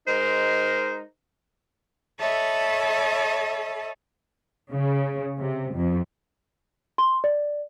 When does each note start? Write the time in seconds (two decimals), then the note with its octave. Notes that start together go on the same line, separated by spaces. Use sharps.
0.07 G#3 D#4 A#4 C5
2.18 A4 C#5 D#5 E5 A5 B5
4.73 C#3
5.39 C3
5.74 F2
6.98 C6
7.24 D5